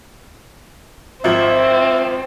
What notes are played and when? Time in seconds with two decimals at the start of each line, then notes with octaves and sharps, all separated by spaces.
1.24 G#1 F3 C4 E5